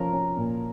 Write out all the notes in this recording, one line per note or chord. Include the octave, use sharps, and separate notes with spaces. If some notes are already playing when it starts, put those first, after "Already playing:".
Already playing: F3 C#4 A#4
C#4
A#2